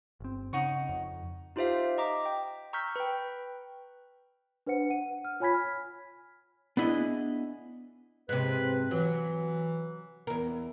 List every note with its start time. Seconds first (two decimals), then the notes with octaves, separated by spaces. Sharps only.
0.20 G1 C4
0.53 C#3 D#4 F#5 C#6
0.89 F2
1.56 D#4 F4 G4 C5 E5 F5
1.98 D#5 A#5 D6 B6
2.26 G5
2.73 A#5 C#6 E6 F6 G6 B6
2.96 B4 G5
4.67 D4 B4 C5 F#5 C#7
4.90 F#5 D#7
5.25 F6
5.40 F4 C#5 G#5 B5 G#6 B6
5.54 F6
6.77 B3 D4 E4 G#4 D#5
8.29 G#2 C3 B4
8.91 E3 F#3
10.27 E2 A#4